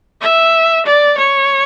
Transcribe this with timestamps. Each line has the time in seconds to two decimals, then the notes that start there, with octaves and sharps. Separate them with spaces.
0.21 E5
0.86 D5
1.17 C#5